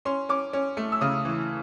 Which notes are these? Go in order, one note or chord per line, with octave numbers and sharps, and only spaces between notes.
C#4 C6
C#4 D6
C#4
A3
E6
C#3 D#6
E3